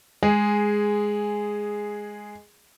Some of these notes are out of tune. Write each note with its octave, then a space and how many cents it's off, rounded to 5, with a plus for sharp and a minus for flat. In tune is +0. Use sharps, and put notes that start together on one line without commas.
G#3 +0 G#4 -5